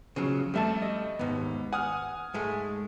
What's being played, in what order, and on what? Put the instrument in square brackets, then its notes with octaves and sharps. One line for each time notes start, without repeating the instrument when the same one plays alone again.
[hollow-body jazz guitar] C#3 F3 F#3
[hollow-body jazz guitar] F2 E5 A5 [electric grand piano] G3 A3
[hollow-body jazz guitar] D#5
[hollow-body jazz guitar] D#2 G#2 [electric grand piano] B3
[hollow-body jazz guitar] F#5 [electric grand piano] G#5 D#6 F6
[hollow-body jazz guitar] G#2 G#3 A3